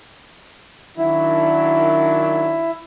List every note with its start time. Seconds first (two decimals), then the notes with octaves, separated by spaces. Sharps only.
0.97 D#3 F#3 D4 E4